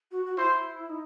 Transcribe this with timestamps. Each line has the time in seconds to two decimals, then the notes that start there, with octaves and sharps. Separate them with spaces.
0.11 F#4
0.26 F#4
0.38 E4 C5
0.89 D#4